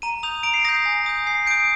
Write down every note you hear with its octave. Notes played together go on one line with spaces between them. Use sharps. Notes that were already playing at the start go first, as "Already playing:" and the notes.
A#5 D#7
D#6 G6 F7
A#5 D7
C7
D#6 G6 A#6
G#5
D#6 G6
G#5 C7
D#6 G6 D7